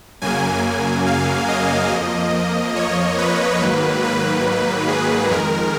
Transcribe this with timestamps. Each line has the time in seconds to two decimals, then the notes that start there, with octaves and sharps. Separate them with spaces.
0.22 F#2 C#3 F#3 A#3 G#5
0.63 G#5
1.07 F5
1.48 D#5
1.91 F2 F3 A#3
2.76 C#5
3.18 B4
3.61 G#2 D#3 F#3 A#3
4.04 B4
4.88 G#4
5.31 F2 D#3 G#3 A#4